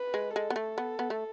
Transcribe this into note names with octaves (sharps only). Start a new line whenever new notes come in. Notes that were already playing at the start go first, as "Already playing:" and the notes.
Already playing: B4
G#3
G#3 A4
B3
A3
B3
B3
A3